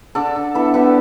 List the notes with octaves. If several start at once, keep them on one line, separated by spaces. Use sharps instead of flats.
D3 A4 D5
D3
B3 E4 A4
B3 D4 G4